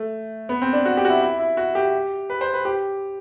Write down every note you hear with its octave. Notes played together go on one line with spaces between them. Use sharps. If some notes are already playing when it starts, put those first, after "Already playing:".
Already playing: A3
B3
C4
D4
F#4
G4
F#4
E4
E4
E4
F#4
G4
B4
C5
B4
G4